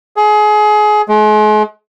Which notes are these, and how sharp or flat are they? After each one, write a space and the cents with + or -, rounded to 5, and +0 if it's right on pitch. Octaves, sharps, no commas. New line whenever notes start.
G#4 +25
G#3 +40